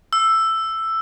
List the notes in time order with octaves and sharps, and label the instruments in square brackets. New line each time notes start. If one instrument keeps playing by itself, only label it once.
[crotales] E6